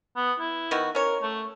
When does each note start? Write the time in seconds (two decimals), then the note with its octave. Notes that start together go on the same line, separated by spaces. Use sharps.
0.17 B3
0.40 E4
0.71 D#3 B3 F#4
0.95 C#4 A#4 C#5
1.22 A3